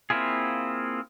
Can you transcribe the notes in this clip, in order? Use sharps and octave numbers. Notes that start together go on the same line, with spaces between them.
A#3 C4 E4 F4 G#4